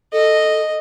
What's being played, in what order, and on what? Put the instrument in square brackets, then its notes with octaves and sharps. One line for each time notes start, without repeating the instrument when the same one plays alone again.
[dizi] A4 [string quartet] D#5